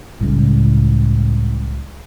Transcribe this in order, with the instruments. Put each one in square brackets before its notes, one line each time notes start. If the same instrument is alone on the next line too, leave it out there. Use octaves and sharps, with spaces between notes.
[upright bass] C#2 G3 [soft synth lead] A2